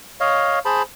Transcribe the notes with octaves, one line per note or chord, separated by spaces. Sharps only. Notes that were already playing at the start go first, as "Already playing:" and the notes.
C#5 D#5 F5
G#4 C5 A5 B5